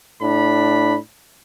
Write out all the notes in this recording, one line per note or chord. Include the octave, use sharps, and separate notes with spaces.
A2 D4 B5